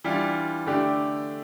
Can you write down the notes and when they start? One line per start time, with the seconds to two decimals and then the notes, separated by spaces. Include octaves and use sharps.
0.04 E3 G3 D4 F4
0.66 D3 A3 D4 G4